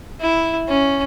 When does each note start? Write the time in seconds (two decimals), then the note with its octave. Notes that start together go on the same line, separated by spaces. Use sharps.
0.21 E4
0.68 C#4